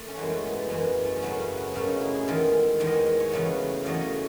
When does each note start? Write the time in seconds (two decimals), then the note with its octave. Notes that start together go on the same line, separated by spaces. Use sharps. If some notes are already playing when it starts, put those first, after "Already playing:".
Already playing: A3
0.08 C#4
0.17 F#2 E3 G#3 B3
0.30 A3
0.44 B3
0.56 A3
0.69 F#2 E3 G#3 B3
1.05 A3
1.16 C#4
1.22 F#2 C#3 F#3 A3 B3
1.40 C#4
1.57 B3
1.74 F#2 C#3 F#3 A3 C#4
1.87 D#4
2.01 E4
2.15 G#4
2.28 E2 D#3 G#3 A4
2.80 E2 D#3 G#3
2.87 D#5
2.93 C#5
3.07 D#5
3.20 C#5
3.31 E2 C#3 F#3 A3 B4
3.83 E2 C#3 F#3 A3 D#5
3.94 C#5
4.01 D#5
4.12 C#5